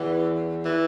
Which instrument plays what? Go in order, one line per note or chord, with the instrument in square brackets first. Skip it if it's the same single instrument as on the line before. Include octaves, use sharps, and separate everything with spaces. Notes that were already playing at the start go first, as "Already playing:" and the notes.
Already playing: [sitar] E2 [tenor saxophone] E3
[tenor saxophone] E3